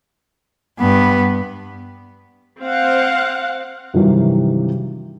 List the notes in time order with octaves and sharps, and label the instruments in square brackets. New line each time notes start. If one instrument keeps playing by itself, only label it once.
[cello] G2 B3
[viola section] C4 F5 F#5
[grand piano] G2 C3 D#3 E3 F#3 G3